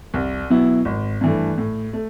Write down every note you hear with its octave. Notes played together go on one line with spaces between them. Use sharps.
C2
B2 F#3 B3 E4
G#1
G2 E3 A3
A2
A3